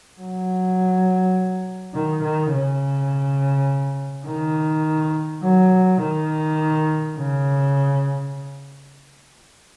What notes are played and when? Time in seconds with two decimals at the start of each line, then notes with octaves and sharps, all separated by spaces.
0.20 F#3
1.94 D#3
2.23 D#3
2.52 C#3
4.27 D#3
5.43 F#3
6.01 D#3
7.17 C#3